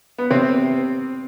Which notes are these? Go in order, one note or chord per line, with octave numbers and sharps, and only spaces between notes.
B3
C3 C4